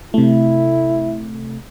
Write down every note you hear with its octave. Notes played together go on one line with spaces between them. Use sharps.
C3 A3 E4